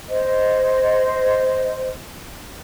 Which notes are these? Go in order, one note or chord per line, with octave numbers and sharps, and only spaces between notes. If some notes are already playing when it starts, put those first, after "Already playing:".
C5 D#5